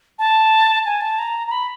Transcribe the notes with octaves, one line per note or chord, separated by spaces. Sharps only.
A5
G#5
A5
A#5
A#5
B5